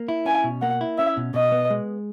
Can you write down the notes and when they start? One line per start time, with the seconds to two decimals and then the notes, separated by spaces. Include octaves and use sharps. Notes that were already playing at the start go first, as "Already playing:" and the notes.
Already playing: A#3
0.08 E4
0.25 C#4 G#5
0.44 B2
0.62 A#3 F#5
0.81 E4
0.98 C#4 E5
1.17 B2
1.34 B2 D#5
1.52 B3
1.70 G#3